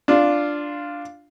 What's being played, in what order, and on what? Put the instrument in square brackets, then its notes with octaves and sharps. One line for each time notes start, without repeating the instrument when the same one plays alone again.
[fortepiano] D4 F4